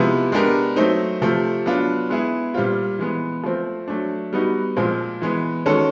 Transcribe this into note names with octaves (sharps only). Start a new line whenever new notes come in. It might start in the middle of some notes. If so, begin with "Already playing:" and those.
Already playing: C3 F3 G#3 B3 E4
G#3 B3 D4 G4 A#4
F#3 A3 C4 D#4
C3 F3 A3
F#3 B3 D4 F4
G#3 B3 E4 G#4
A#2 G3 C4 F4
E3 G#3 B3
F3 A3 C4
F#3 A3 D4
G3 B3 D#4 F#4
A#2 F3 G#3 C4
E3 G#3 B3
D#3 G#3 C#4 F#4 A4